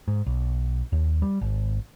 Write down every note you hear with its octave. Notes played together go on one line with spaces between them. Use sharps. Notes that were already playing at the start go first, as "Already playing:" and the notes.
G#2
B1
D#2
G3
G#1